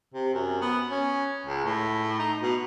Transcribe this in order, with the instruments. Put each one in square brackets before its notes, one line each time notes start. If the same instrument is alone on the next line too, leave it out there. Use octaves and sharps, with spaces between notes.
[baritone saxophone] C3
F#2
B3
C#4
C#2
A2
D#4
B2